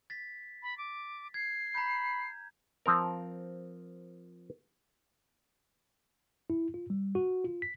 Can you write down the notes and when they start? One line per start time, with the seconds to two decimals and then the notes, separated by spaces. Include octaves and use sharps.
0.10 A6 B6
0.63 B5
0.78 D6
1.34 G#6 C7
1.75 A#5 B5 G6
2.86 F3 C4 A#4
6.50 E4
6.74 F4
6.90 G3
7.15 F#4
7.44 F4
7.62 B6